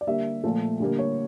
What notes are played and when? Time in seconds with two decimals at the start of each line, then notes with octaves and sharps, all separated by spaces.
0.01 D5
0.07 D3 G3 A#3 E5
0.44 A#2 F3 A3
0.80 D3 G3 A#3
0.99 C#5